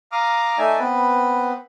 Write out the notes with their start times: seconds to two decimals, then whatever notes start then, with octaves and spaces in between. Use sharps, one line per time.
0.12 F5 A#5 D6 D#6 F6
0.58 A3 D#4 D5 E5 G#5
0.79 B3 C4 B4